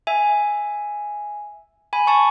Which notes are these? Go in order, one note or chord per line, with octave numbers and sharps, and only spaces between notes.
E5 G#5
G#5 B5
A5 C#6